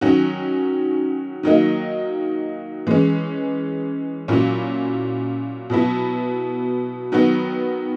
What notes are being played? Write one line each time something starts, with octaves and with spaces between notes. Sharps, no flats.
D#3 F#3 C#4 F#4
D#3 F#3 A#3 D#4
E3 G#3 C#4
A#2 F#3 C#4 E4
B2 F#3 B3 E4
D#3 F#3 B3 F#4